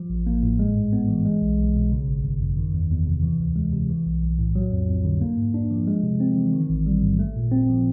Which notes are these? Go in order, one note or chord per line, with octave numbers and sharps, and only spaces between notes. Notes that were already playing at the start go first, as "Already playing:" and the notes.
Already playing: F3
A1
A#3
A2
G#3
G#2
B3
E3
G#3
B1
B1
B2
C#3
G#1
G#1
F#2
D#3
E2
E2
C3
E3
D2
G#3
C3
E3
B1
B1
A2
F#3
F2
F2
D3
A#3
G#2
D4
F3
G#3
C3
C4
E3
D#3
A1
G3
G#2
A3
A#2
C4
F3